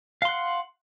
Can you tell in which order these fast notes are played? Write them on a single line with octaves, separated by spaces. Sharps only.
F5 C6 F#5